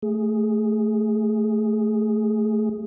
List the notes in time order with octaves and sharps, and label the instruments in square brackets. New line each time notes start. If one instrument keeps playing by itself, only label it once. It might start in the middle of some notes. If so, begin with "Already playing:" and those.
[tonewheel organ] A3 G#4